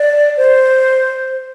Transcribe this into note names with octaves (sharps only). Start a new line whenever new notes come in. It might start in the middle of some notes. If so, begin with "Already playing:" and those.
Already playing: D5
C5